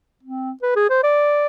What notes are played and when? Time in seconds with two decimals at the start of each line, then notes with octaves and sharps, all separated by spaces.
0.23 C4
0.63 B4
0.76 G#4
0.90 C5
1.03 D5